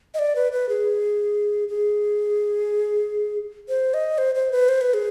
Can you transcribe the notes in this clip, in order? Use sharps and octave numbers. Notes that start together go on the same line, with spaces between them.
D#5
D5
B4
B4
G#4
G#4
C5
D#5
C5
C5
B4
C5
B4
G#4